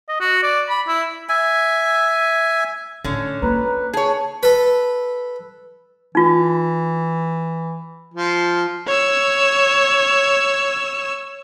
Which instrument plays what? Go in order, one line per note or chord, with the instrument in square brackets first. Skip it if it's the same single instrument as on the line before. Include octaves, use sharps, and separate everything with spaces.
[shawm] D#5
F#4
D5
B5
E4
[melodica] E5 G#5
[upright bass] A2 [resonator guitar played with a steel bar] D3 C#4
[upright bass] A#3 F4 [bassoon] B4 [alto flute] A#5
[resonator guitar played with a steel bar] G#4 C#5 [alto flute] A5
[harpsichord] A4 B4
[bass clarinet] E3 [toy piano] D#4 F4
[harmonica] F3
[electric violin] C#5 E6